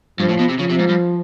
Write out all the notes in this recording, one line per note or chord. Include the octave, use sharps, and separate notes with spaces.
G2 F3
A2
B2
C3
C#3 F3
C3
G#2
G2